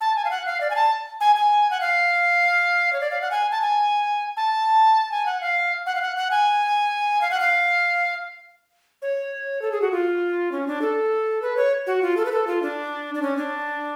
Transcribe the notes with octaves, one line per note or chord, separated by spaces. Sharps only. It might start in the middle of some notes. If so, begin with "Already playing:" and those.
A5
G#5
F5
F#5
F5
D5
G#5
A5
G#5
G#5
F#5
F5
C#5
D5
F5
F#5
G#5
A5
G#5
A5
G#5
F#5
F5
F#5
F5
F#5
F#5
G#5
F5
F#5
F5
C#5
A4
G#4
F#4
F4
C#4
D4
A4
B4
C#5
F#4
F4
A4
B4
A4
F4
D4
D4
C#4
D4